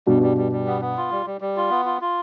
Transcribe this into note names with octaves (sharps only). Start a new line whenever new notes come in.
G2 B2 G3
G3
G3
G3
B3
B3
F4
G3
G3
G3
F4
B3
F4
F4